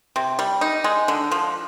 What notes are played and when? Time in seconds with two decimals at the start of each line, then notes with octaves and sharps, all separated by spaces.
0.16 C3
0.39 G3
0.61 D#4
0.84 G#3
1.08 D3
1.32 F3